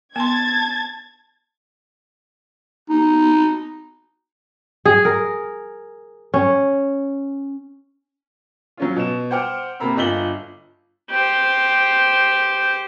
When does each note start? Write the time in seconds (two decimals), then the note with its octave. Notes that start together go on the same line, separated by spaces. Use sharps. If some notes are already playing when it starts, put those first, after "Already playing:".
0.16 B3 A5 C6 G#6 A6
2.90 D#4
4.85 G#4
5.05 A#4
6.34 C#4
8.77 F#3 C#4 F4
8.96 B2 E7
9.31 C5 F#5 G5 D6 F6
9.80 C3 A#3 A#5 B5 E6
9.96 G1 F4 D#5 B6 F#7 G7
11.10 G4 C5